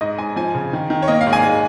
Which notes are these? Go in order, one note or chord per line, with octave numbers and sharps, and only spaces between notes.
G#2 D#5
G#2 G#5
F3 G#5
C#3
D#3
D#3
C#5
A#3 D#5
F5
G#2
G#5
G#3